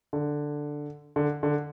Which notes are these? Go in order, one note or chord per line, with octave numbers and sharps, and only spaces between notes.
D3
D3
D3